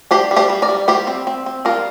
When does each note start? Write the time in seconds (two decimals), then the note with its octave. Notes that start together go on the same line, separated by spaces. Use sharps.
0.11 D4 G4 C5
0.31 G3
0.36 G4 C5
0.49 G3
0.62 A#4 D5
0.69 G3
0.88 G3 G4 C5
1.07 C4
1.27 C4
1.46 C4
1.65 G3 F4 A#4